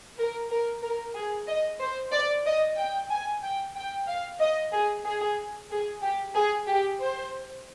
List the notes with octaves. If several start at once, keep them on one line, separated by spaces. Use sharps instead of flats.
A#4
A#4
A#4
G#4
D#5
C5
D5
D#5
G5
G#5
G5
G5
F5
D#5
G#4
G#4
G#4
G4
G#4
G4
C5